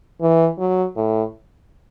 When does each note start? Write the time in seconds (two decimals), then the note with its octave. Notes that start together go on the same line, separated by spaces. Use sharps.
0.21 E3
0.59 F#3
0.96 A2